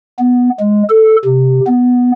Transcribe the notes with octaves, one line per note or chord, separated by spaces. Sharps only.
B3
G#3
A4
C3
B3